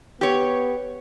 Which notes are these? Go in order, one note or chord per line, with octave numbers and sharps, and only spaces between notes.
B3 G4 C#5